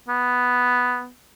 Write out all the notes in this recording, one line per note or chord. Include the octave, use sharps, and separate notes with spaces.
B3